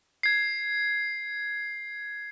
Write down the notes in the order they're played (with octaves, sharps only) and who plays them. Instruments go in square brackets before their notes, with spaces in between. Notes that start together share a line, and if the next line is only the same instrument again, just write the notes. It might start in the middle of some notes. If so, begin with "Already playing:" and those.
[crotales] G#6 C7